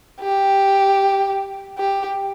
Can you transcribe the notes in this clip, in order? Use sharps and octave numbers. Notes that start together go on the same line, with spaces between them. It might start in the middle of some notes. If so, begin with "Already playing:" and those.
G4
G4